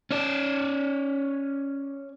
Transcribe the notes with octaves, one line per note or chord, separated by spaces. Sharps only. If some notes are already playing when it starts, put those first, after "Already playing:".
C#4 D5